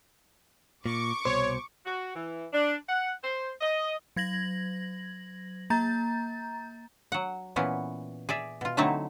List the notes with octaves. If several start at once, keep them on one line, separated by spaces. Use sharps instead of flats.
A#2 C#6 D6
C2 B2 C5 C#5
F#4
E3
D4
F#5
C5
D#5
F#3 G#6 A#6 F#7
A#3 A#5 G6 A6
F#3 F#5
A#2 E3 B3 C#4
G#4 D5 E5
B2 F4
D3 F#3 A3 C4 D#4 E4